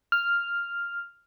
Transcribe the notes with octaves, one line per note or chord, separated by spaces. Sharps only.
F6